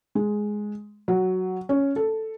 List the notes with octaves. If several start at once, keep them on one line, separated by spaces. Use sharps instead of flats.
G#3
F#3
C#4
A4